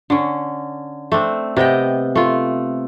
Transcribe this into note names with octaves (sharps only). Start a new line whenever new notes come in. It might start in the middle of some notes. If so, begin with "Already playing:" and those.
D3 C#4
A3 C4 D4
C3 B3 D#5 G5
A3 F4